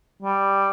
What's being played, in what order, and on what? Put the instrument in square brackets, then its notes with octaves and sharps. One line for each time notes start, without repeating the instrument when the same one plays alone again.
[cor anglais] G3